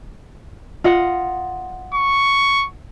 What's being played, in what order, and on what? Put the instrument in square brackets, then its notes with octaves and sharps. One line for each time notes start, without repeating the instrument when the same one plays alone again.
[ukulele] F4 D#5 F#5
[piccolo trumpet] C#6